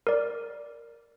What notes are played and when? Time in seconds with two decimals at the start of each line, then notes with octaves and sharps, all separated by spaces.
0.07 A#4 D5